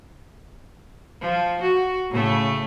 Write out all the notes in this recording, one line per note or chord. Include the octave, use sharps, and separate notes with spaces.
F3
F#4
A2 C#3 A3